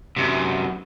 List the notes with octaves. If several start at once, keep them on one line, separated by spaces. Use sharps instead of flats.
F#2 C3